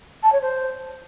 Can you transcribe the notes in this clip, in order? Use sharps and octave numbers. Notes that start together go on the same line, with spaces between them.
A5
C#5
C5